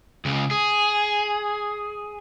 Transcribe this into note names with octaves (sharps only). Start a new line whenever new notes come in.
C#2 C#3
G#4